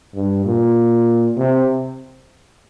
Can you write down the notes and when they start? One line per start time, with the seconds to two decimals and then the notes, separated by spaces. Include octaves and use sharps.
0.15 G2
0.45 A#2
1.37 C3